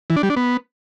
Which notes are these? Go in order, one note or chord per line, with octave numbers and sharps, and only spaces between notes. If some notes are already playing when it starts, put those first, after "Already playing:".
E3
D4
G3
D4
B3